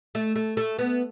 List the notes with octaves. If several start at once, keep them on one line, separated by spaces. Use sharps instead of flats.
A3
A3
A3
B3